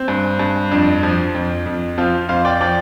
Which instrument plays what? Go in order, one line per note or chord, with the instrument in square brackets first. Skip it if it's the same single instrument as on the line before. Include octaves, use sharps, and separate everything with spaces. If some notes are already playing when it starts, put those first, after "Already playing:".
Already playing: [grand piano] C4
G2
G2
F2 D4
F3
F2
F2
F3 C4 F4
F2 C5 F5
D5 G5
F3 D5 G5